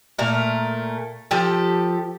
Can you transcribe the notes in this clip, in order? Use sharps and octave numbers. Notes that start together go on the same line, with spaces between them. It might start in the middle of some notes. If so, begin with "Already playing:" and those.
A#2 A3 A#4
F3 G4 A4